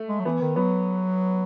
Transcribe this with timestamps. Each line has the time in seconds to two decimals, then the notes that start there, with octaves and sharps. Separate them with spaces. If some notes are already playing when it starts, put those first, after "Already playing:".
Already playing: A3
0.09 G#3
0.20 F#3
0.25 E3 B3
0.41 D#3
0.56 F#3 B3